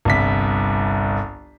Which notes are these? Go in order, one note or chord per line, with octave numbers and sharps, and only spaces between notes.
G1 C2 B6